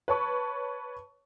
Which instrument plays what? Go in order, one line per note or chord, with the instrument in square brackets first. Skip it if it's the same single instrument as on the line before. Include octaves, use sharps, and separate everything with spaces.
[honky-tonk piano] B4 C#5 A5 C#6